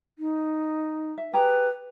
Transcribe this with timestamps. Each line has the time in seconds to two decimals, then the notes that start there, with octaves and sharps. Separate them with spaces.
0.19 D#4
1.18 E5
1.33 G4 G#4 B4 A#5